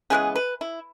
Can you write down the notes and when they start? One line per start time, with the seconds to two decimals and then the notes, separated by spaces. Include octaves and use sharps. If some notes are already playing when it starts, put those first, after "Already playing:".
0.10 C#3 E3 G#3 B3 G#4
0.35 B4
0.61 E4